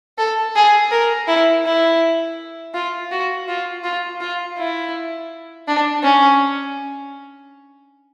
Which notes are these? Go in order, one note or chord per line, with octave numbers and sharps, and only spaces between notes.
A4
G#4
A#4
E4
E4
F4
F#4
F4
F4
F4
E4
D4
C#4